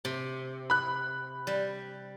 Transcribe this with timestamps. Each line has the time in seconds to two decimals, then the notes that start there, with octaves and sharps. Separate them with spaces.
0.05 C3
0.70 B5 F#6
1.47 G3